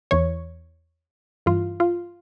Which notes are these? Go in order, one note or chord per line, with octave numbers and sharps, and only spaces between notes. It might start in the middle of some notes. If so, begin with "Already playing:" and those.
E2 E3 C#5
G2 E3 F4
F4